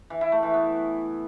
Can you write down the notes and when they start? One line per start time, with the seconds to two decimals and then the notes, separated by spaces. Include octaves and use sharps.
0.10 E3
0.21 E4
0.32 A3
0.43 E3
0.54 B3